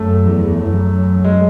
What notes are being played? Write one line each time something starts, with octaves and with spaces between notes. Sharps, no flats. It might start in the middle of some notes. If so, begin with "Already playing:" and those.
Already playing: F#2 A3
E2
F#2
G#3